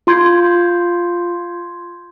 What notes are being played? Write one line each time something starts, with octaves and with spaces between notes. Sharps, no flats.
F4 C6 G6 G#6